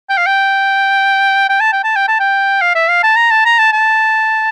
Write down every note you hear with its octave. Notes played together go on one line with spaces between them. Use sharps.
G5
F5
G5
G5
A5
G5
A5
G5
A5
G5
F5
E5
F5
A5
A#5
A5
A#5
A5
A5